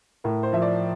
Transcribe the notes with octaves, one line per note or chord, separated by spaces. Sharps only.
A2 A#4
C5
F3 E5
D5